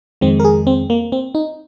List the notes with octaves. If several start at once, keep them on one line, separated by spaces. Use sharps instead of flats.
F2 D#3 G#3 C4
A#4
G#4
C4
A#3
C4
D#4